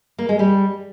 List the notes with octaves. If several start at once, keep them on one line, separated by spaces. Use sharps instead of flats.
A#3
G#3
G3